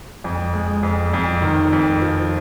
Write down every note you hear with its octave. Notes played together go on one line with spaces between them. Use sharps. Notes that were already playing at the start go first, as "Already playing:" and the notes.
F2
G#3
F2
F2
D#3
F2
F3